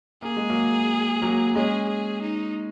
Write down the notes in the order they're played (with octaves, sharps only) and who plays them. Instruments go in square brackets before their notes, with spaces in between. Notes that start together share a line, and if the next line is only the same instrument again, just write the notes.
[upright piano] A#3 [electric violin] G#4
[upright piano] G#3
F#3 A#3
F#3 A#3
[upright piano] G#3 C#4 [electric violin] G#4
[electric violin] G#4
D#4